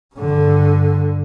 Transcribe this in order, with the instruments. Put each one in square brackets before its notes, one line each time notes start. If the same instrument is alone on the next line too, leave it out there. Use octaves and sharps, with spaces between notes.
[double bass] G2 D3